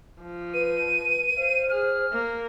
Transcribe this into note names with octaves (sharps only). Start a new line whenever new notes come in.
F3
B4 D#7
C5 F5
G#4 F6
A#3